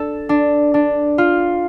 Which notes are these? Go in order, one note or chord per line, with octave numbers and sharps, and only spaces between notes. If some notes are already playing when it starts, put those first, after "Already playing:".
Already playing: D4 A4
D4
D4
F4